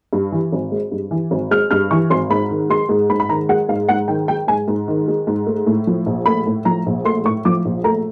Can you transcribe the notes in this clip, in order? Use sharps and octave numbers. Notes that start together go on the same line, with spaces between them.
G2
E3
G#1
G#3
G2
E3
G#1
G#3 F6
G2 F6
E3 C#6
G#1 C6
G#2 B5
D#3
G#3 C6
G#2
G#2 B5
B5
D#3 A#5
G#3 F#5
G#2 F5
G#2 F#5
D#3 G5
G#3 G5
G#2 G#5
G#2
D#3
G#3
G#2
A3
A2
F3
A#1
A3 B5
A2
F3 A#5
A#1
A3 C6
A2 C#6
F3 D6
A#1
A3 A#5